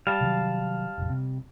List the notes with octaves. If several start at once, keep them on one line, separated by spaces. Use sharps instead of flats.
G3 F5 A5
C3 D#3 F#3
F1 A#1
C3